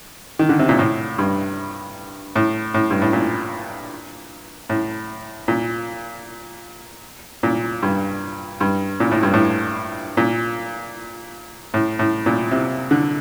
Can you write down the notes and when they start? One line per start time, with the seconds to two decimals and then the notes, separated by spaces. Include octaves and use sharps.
0.39 D#3
0.49 D3
0.59 C3
0.69 A#2
0.79 A2
1.18 G2
2.36 A2
2.74 A2
2.90 G2
3.02 A2
3.13 A#2
4.70 A2
5.48 A#2
7.43 A#2
7.82 G2
8.61 G2
9.00 A#2
9.12 A2
9.23 G2
9.34 A2
10.17 A#2
11.74 A2
11.99 A2
12.26 A#2
12.51 C3
12.91 D3